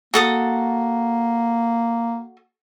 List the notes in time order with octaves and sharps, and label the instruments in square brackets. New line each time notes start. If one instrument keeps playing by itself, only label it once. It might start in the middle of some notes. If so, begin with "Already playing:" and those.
[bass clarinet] A#3 [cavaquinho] F#4 A4 D#6